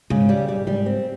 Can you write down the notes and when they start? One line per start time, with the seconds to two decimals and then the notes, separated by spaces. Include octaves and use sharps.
0.10 G#2 C#3
0.29 G3
0.48 G3
0.67 G#2 G3
0.86 C4